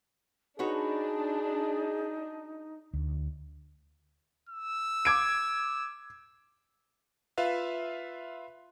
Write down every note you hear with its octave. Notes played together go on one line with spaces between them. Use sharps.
D4 D#4 F#4 G#4 B4 C#5
D2
E6
D6 G#6 D7
F4 B4 E5 F5